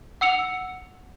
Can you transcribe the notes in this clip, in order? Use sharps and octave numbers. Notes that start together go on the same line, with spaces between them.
F#5 E6 C#7 F7